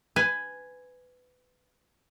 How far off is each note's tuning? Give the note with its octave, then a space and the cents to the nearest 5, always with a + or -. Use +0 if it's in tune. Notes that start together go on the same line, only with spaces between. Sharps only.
B4 +20 G#5 +0